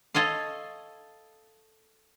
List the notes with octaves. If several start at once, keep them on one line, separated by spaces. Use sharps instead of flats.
A4 C#5 D#5 F5